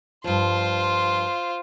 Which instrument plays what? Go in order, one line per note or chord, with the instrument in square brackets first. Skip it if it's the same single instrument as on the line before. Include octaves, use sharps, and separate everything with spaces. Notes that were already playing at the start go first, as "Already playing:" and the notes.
[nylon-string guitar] G2 F3 [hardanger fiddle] F4 C5